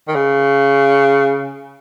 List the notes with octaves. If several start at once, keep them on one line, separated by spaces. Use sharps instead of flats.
D#3
C#3